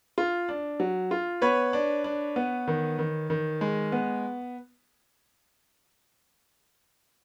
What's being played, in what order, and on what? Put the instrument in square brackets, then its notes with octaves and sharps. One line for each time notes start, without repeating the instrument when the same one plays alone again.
[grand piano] F4
D4
F#3
F4
B3 B4 C#5
D4
D4
B3
D#3
D#3
D#3
G#3
B3